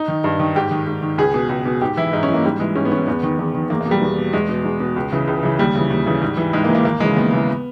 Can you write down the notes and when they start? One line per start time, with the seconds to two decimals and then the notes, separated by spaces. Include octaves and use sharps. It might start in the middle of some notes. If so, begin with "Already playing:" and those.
Already playing: D#4
0.08 D#3
0.24 G2
0.40 D#3
0.56 G#2 G4
0.71 D#3
0.87 G#2
1.03 D#3
1.18 C#2 G#4
1.34 B2
1.49 C#2
1.66 B2
1.81 G#2 G4
1.97 E3 E4
2.13 G#2 D#4
2.23 C#4
2.28 E3
2.34 A#3
2.44 G#2 G3
2.59 E3 G#3
2.75 G#2 C#4
2.85 B3
2.92 E3 C#4
3.07 E2 B3
3.23 D#3
3.39 E2
3.54 D#3
3.70 E2 A#3
3.81 A#3
3.86 B2
3.91 G3
4.01 E2
4.18 B2
4.33 E2 G#3
4.49 B2
4.65 E2
4.80 B2
4.96 C#2
5.12 C#3 E3
5.28 C#2
5.43 C#3 E3
5.59 D#2 G3
5.75 C#3 E3
5.90 D#2
6.06 C#3 E3
6.22 G#2
6.37 E3
6.53 G#2 G#3
6.64 A#3
6.69 E3
6.75 A#3
6.85 D#2 A#3
7.00 C#3 E3 G#3
7.16 D#2 B3
7.33 C#3 E3